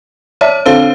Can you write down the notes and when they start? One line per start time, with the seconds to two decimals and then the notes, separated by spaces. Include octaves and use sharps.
0.41 C#5 D5 E5 A5
0.66 D3 C4 A4 C5 F5